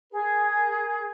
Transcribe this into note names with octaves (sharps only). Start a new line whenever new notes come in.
G#4 A#4